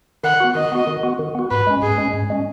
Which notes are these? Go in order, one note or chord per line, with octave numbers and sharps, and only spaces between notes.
D#3 F#5
B3 F#4
D#3 D#5
B3 F#4
D#3
B3 F#4
D#3
B3 F#4
G#2 B4
G#3 C#4
G#2 G#4
G#3 C#4
G#2
G#3 C#4